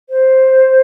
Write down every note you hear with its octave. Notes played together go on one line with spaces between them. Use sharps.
C5